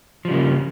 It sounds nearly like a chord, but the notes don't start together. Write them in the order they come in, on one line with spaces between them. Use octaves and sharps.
F3 G3 C#3 A#3